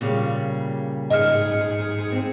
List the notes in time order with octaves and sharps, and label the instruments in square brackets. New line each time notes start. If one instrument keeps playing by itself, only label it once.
[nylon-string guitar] A#2 C#3 G3
[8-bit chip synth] G#2 G#4 C#7 [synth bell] D#5 F6
[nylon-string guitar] C4